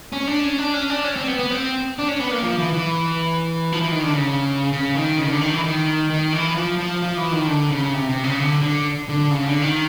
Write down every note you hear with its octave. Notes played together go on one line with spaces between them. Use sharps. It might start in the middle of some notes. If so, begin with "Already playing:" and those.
C#4
D4
C#4
D4
C#4
D4
C#4
C4
B3
B3
C4
D4
C#4
B3
A#3
F3
E3
E3
F3
E3
D#3
D3
C#3
C#3
D#3
C#3
D#3
D3
D#3
E3
D#3
D#3
E3
F3
F3
F3
E3
D#3
D3
C#3
C3
C3
C#3
D3
D3
D3
C#3
D3
D#3